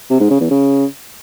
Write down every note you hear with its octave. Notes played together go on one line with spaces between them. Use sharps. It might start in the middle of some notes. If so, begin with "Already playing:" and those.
C3
G#2
C#3
E2
C#3